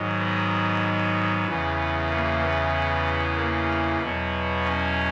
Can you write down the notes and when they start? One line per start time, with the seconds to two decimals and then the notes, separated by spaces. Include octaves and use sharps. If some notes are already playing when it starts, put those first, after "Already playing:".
Already playing: G#2 D#3 F#3
0.19 B3
1.47 E2 C#3 E3
2.10 A#3
2.42 B3
3.37 A#3
4.00 E2 B2 F#3 B3
4.63 C#4